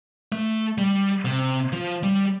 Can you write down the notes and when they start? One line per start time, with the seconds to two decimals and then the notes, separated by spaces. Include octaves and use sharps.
0.32 A3
0.78 G3
1.25 C3
1.72 F3
2.03 G3